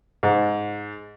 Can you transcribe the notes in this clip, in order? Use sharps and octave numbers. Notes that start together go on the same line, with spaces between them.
G#2